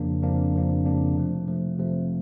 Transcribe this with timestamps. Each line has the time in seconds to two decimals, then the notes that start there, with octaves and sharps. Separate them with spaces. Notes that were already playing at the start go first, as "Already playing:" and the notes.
Already playing: F2 C#3 F3 A#3 D4
0.22 F2 C#3 F3 A#3 D4
0.53 F2 C#3 F3 A#3 D4
0.85 F2 C#3 F3 A#3 D4
1.16 C3 F3 A3
1.47 C3 F3 A3
1.79 C3 F3 A3